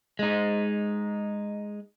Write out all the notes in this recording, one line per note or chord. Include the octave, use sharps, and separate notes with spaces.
G#3 D#4